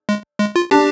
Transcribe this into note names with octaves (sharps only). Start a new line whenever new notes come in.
G#3
G#3
F4
D4 G4